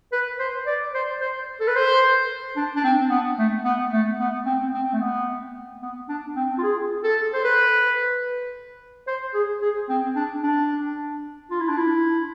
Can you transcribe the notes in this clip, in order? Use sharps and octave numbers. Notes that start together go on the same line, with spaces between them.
B4
C5
D5
C5
C5
A4
B4
C5
D4
D4
C4
B3
A3
B3
A3
B3
C4
C4
A3
B3
B3
D4
C4
F4
G#4
A4
C5
B4
C5
G#4
G#4
C4
D4
D4
F4
E4
D4
E4